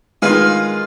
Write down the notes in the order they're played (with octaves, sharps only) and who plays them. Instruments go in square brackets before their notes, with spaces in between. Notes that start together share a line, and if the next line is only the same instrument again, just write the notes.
[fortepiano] D#3 G#3 [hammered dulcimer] F4 F5 [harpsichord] G#4 B4 G#5